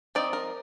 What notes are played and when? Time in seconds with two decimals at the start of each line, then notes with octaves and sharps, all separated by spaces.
0.15 F3 C4 D#4 D5
0.33 A#4